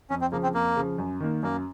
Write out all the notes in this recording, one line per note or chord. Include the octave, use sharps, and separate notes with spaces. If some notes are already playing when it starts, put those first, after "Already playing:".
F2 C#4
C4
C#3 F3 A#3
C4
F2 A#3
C#3 F3
F#2
D#3 A#3
F#2 A#3